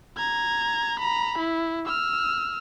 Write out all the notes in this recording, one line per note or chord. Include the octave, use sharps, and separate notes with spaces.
A#5 G#6
A#5 B5
E4
E6 F6